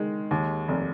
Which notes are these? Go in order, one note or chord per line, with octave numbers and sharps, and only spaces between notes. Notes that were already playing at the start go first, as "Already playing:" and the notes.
Already playing: D#3 G#3
D#2
F1